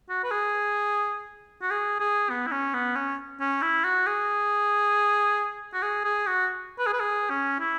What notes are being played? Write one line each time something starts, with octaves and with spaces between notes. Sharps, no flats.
F#4
B4
G#4
F#4
G#4
G#4
B3
E4
C#4
B3
C#4
C#4
E4
F#4
G#4
F#4
G#4
G#4
F#4
B4
G#4
B4
G#4
C#4
E4